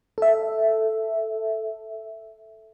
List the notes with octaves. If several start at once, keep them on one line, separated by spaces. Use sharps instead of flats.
A4 E5